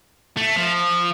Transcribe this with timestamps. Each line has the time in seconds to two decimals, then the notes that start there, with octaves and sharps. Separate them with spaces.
0.37 A3
0.56 F3